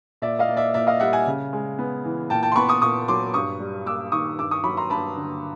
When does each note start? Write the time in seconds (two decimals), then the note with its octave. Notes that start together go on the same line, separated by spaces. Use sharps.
0.22 A#2 D5 E5
0.39 D#5 F5
0.49 A#3
0.57 D5 E5
0.74 A#2 D5 E5
0.87 D#5 F5
1.00 G3 E5 F#5
1.13 F#5 G#5
1.27 C#3
1.53 G#3
1.79 B3
2.05 E3
2.30 A#2 G5 A5
2.43 G5 A5
2.52 C6
2.56 B3 B5 C#6
2.69 C#6 D#6
2.82 A#2 C#6 D#6
3.08 F#3 C6 D6
3.34 G2 C#6 D#6
3.60 G3
3.86 A#3 D6 E6
4.12 D#3 C#6 D#6
4.39 G2 D6 E6
4.51 C#6 D#6
4.64 F#3 B5 C#6
4.77 A#5 C6
4.90 G2 A5 B5
5.17 D3